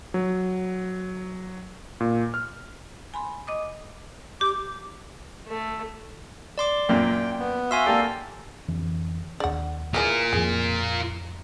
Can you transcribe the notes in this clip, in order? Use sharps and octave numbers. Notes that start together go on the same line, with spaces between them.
F#3
A#2
F6
G#5 B5 C6
D#5 D6 D#6
G4 D6
A3
D5 C6 D6
F#2 A#2 A#3 G5
B3
F#4 E5 F5 G#5 C6 E6
A#3 G4 A4 D5 F5
F2 D3 E3
D#2 D4 D5 F#5
E3 F4 G4 G#4 A#4
F2 A2 F3 G#4